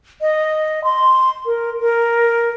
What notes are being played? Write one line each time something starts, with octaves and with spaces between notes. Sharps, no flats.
D#5
C6
A#4
A#4